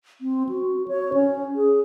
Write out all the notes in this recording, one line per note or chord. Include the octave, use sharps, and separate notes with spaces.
C4
F#4
C#5
C#4
G#4